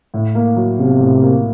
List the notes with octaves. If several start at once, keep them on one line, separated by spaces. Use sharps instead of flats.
A2
A#3
F#3
B1 C3
A2
A#3